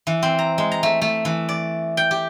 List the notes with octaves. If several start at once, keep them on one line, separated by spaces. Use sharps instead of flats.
E3
C4
A#5
G#3
A#5
A3
A3
E3
D5
G5
G4